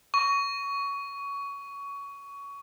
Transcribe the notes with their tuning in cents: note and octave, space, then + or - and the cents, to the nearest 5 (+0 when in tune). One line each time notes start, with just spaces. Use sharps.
C#6 +20